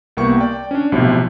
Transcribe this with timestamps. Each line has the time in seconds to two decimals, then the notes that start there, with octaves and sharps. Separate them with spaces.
0.17 C2 A#3 B3 G5 C#6
0.40 D5 G5
0.71 C#4 D4
0.92 B1 A2 C3 F3